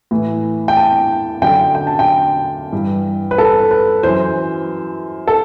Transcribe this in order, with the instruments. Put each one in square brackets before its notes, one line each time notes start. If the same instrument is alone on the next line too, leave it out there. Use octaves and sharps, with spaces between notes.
[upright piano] A2 E3
G5
A5
F#2 D3 G5
G5
A5
G5
G2 E3
B4
A4
B4
F#2 E3 C5
A4